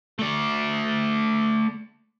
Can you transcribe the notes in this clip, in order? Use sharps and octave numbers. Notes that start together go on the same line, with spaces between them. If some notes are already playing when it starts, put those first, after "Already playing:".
A3 D5